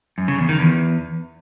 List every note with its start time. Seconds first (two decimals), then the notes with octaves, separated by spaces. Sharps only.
0.18 F#2
0.28 C#3
0.38 E2
0.49 D#3
0.59 E2